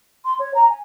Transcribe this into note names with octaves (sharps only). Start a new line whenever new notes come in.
C6
C#5
A#5
G#5